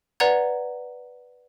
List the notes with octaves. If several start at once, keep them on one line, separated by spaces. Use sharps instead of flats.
B4 D5 F#5 A#5 G#6